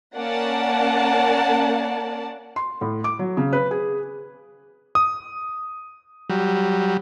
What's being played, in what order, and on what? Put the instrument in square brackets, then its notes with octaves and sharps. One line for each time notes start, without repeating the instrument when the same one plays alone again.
[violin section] A#3 C#4 D5 F#5 A5
[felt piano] C6
A2
D6
F#3
C#3
B4
G#4
[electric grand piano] D#6
[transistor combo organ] F#3 G3